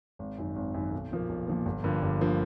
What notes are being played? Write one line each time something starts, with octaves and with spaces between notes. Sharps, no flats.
G#1
F#2 D#3
G#1
F#2 D#3
B1
A#2 F3 A#3
B1
A#2 F3 A#3
G1
G2 D3 F3 A#3
G1
D3 F3 A#3